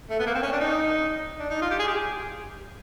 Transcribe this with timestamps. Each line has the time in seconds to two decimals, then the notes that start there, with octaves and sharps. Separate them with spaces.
0.10 A3
0.20 B3
0.27 A#3
0.35 C4
0.43 C#4
0.52 D4
0.60 D#4
1.39 D4
1.50 D#4
1.62 F4
1.71 G4
1.79 G#4
1.88 G4